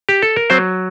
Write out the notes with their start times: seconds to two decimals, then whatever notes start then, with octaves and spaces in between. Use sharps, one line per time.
0.09 G4
0.22 A4
0.36 A#4
0.50 F#3 C4 C5